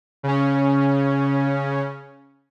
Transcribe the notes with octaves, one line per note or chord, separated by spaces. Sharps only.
C#3 C#4